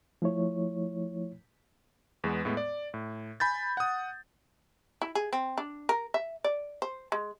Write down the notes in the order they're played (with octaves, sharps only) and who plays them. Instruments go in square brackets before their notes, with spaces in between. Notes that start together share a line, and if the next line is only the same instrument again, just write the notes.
[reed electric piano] F3 A3 E4 C#5
[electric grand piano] E2 G#3 B3
A2 G#3 B3
D5
A2
G#5 B5 G6 A6
F#5 D#6
[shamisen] E4
G#4
C4
D4
A#4
E5
D5
C5
G#3